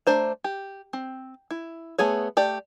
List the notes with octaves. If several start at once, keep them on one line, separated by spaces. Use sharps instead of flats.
A3 D4 C5 A#5
G4
C4
E4
A3 B3 G#4 C#5
A3 G4 D5